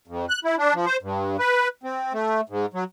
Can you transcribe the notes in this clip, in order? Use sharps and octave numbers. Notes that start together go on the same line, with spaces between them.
F2
F#6
E4
D4
F3
C5
G2
B4
C4
A3
G#2
F#3